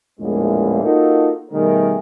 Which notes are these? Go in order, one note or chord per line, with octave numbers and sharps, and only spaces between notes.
A#1 E2 A2 G#3 A#3
A#3 D#4 F4 F#4 A4
B2 D#3 G3 A3 G#4 A#4